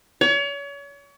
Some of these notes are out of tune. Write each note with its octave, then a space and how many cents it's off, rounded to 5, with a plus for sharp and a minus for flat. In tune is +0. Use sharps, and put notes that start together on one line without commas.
C#5 +35